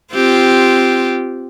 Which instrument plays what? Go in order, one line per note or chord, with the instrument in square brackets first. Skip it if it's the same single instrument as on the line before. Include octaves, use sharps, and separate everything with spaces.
[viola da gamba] C4 F4 G4